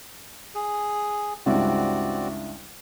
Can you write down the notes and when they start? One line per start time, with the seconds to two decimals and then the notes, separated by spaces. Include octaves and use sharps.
0.55 G#4
1.46 C#2 G2 C4 E4 F#4 D5